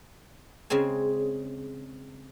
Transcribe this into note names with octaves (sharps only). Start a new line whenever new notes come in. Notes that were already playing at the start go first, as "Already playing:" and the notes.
C#3 G#3 C4 G#5